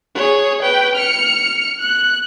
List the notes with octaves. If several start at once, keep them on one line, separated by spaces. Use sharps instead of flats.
G#4 C#5
B4 G5
F6 C#7
F#6